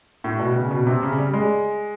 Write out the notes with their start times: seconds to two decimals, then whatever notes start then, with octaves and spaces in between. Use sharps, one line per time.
0.24 A2
0.39 B2
0.55 C#3
0.71 B2
0.87 C3
1.02 C#3
1.18 G3
1.33 G#3